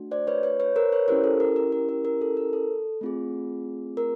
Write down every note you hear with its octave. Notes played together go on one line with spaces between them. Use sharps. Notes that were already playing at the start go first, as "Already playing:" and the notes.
Already playing: A3 D4 F#4
C5 D5
B4 C#5
B4 C#5
B4 C#5
A#4 C5
B4 C#5
C#4 E4 G4 A#4 C5
A4
A#4
A#4
A#4
A#4
A#4
A4
A#4
A4
A3 C4 F4 G#4
A#4